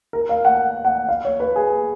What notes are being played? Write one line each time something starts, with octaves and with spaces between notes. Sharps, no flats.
A#4
F5
F#5
F#5
F5
C#5
B4
G#4